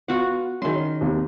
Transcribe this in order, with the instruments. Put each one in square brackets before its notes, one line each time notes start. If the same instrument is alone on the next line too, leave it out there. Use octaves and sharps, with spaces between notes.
[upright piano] B3 F4 [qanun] F#4 F#5
[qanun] D#3 C6 [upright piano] F#3 E4 G#4
[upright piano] C#4
D#2 C3